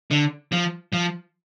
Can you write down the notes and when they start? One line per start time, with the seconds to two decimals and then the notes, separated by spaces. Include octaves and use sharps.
0.11 D3
0.52 F3
0.93 F3